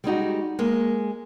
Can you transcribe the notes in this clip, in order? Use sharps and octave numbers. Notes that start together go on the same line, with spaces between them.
G3 G#3 D#4 F#4
G#3 A#3